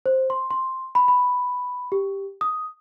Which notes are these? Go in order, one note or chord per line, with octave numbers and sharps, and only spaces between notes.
C5
C6
C6
B5
B5
G4
D#6